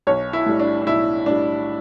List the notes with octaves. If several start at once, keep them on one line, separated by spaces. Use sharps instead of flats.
B1 C#5
E4
A2 G3
D4
D4
B1 E4
A2 G3 D4